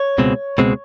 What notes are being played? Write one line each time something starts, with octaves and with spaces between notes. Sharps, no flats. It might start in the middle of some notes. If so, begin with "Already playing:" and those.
Already playing: C#5
C#2 B2 G#3 C4
C#2 B2 G#3 C4